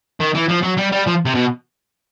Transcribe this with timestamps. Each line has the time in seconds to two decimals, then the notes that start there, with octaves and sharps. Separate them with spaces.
0.20 D#3
0.35 E3
0.49 F3
0.63 F#3
0.78 G3
0.92 G3
1.07 F3
1.25 C3
1.35 B2